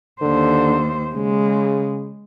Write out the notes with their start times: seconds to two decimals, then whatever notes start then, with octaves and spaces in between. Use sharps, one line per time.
0.21 D#2 D3 C5
1.15 C#3 G#3